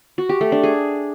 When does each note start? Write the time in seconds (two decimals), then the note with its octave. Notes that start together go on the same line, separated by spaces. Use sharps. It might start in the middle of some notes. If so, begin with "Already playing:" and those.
0.18 F#4
0.29 G4
0.41 A3
0.52 D4
0.63 G#4